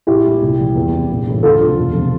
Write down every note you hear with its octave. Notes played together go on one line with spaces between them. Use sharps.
A#1 E4 G4
A#2 G3
C2
A#2 F3
E2
C3 G3
A#1
A2 E3
D2 F4 A4
C3 F3
E1
C3 F3